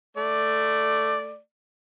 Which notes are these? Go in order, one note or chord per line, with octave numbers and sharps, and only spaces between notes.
A3 D5